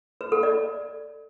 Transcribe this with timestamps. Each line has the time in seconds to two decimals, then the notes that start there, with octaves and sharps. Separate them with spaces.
0.21 B4
0.32 A4
0.43 D5